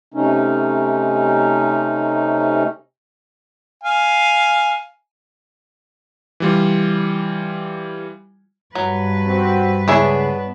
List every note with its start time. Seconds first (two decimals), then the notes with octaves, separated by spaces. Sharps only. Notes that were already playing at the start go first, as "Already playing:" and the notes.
0.14 C3 A3 C#4 D#4
3.84 F5 G#5
6.40 E3 G3 F4
8.75 G2 F#3 B4
9.26 C4 F#4
9.88 C#2 B3 D4 E4 G#4 C#5